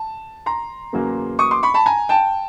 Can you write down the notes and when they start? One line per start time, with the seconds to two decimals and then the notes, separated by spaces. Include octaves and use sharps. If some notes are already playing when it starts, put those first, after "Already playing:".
Already playing: A5
0.46 A#5 C6
0.93 E2 C#3 F#3 A#3
1.39 C#6 D#6
1.51 C6 D6
1.63 B5 C#6
1.74 A5 B5
1.86 G#5 A#5
2.09 G5 A5